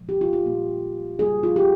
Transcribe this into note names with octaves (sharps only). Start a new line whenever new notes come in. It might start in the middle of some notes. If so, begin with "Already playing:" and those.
Already playing: A#2 F3 G#3
G4
F4
F4
A#2 G3 A#3
C#3 G3 A#3 G#4
F4
G4